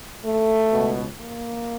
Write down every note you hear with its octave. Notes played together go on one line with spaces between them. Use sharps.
A3
C#2 B2
A#3